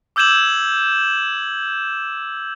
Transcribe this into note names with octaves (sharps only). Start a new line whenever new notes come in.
D6 E6 G6 G#6 E7 F#7